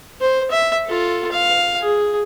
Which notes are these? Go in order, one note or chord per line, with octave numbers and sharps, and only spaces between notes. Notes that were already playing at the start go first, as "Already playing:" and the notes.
C5
E5
F4 A4
F5
G#4